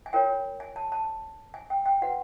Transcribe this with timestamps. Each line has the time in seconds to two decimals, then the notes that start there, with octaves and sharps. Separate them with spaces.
0.06 G#5
0.13 F4 A#4 C#5 G5
0.60 G#5
0.76 A5
0.92 A5
1.54 G#5
1.70 G5
1.86 G5
2.02 F#4 B4 F#5